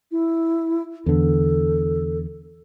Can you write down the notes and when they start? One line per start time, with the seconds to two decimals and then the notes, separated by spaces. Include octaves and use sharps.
0.11 E4
1.06 E2 D3 A4